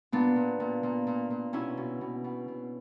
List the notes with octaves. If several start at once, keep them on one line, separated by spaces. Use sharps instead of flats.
A#2 B3 D4
A#2
A#2
A#2
A#2
A#2
B2 C#4 E4
B2
B2
B2
B2